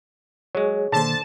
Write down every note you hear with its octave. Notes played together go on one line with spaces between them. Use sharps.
F#3 G#3 G#4 C#5
B2 D3 D#3 A#3 C5 A5